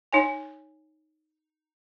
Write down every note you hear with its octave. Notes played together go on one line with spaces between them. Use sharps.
D#4 C#5 G#5